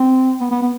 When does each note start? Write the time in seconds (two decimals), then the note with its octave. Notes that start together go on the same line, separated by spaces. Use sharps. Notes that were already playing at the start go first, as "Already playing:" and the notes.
Already playing: C4
0.41 B3
0.51 B3
0.62 B3